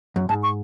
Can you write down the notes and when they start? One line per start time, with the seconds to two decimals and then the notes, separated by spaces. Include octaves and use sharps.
0.16 F#2
0.29 G#2 A5
0.43 C#6